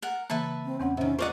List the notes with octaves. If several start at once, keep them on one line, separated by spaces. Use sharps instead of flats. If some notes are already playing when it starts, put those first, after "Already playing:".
A#4 F#5
C#3 E3 A#3 B4 E5 A5
C4
E2 C4 C#4 F#5
C3 D#3 C#4
F4 A#4 C5 D5 D#5 F#5 C#6